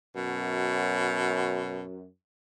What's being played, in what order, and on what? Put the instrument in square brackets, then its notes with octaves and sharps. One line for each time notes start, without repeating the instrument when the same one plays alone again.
[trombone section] F#2 [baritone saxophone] B2